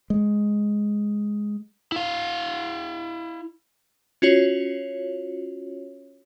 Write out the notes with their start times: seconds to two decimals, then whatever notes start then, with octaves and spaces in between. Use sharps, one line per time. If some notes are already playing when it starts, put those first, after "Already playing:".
0.10 G#3
1.92 E4 F5
4.22 C#4 F4 F#4 C#5